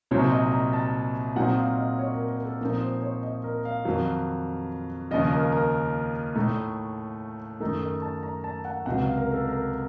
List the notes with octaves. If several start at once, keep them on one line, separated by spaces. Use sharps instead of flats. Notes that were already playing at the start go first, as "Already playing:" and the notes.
C2 A#2 F#3 C4 D#4 C#5
D#5
A#5
A5
A#2 F#3 C4 D#4 F#5
F5
D#5
C#5
A#4
A#4
A4
A#2 F3 C4 D#4 A#4
C5
C#5
D#5
A#4
F5
F2 D#3 F#3
D#2 C#3 F3 D#5
A#4
A#4
A2 A3 D#4
F#2 D#3 A3 D#4 A4
A#4
A5
A#5
A5
F#5
C#2 C3 F#3 F#5
F5
A#4
A4
A#4